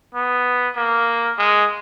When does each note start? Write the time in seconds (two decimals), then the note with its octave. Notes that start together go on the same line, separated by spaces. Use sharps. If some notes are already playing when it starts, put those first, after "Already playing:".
0.15 B3
0.76 A#3
1.38 G#3